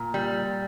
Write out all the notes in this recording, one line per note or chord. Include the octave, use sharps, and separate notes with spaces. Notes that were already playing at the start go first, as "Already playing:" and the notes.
Already playing: A#2
G3